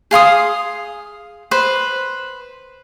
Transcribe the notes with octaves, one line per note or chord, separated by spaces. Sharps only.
G#4 F5 C6 D#6
B4 C5